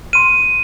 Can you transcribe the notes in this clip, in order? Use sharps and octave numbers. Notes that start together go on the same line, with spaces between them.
C6 F6 D#7